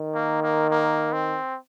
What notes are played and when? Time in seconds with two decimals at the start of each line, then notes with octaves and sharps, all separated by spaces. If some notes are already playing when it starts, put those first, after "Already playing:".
Already playing: D#3
0.14 A#3
0.42 A#3
0.70 A#3
1.13 C4